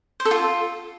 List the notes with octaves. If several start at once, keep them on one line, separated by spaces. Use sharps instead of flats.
C5
A4
F4